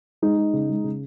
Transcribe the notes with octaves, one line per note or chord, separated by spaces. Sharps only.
G#3 D#4
G#3
C#3
G#3
C#3